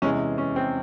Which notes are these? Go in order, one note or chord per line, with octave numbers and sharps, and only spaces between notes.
E2 C3 E3 G#3 C#4
C#4
C4